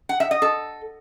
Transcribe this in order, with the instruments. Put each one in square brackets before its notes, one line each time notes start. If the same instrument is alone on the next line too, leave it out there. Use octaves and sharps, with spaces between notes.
[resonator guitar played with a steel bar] F#5
E5
D#5
A4